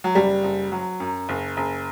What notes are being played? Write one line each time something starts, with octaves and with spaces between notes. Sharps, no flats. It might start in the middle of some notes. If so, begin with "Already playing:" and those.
F#3
F#1 G3
F#1
F#3
F#2
F#1
F#1